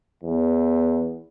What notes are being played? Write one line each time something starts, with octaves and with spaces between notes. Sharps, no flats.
E2